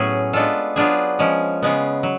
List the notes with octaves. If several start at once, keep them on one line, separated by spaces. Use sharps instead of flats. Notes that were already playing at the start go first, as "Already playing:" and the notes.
Already playing: A2 F#3 B3 C#4 G#4
G#3 B3 D4 F4 A4
F#3 B3 D4 F4 G#4
F3 G#3 C#4
C#3 G#3 B3
F#3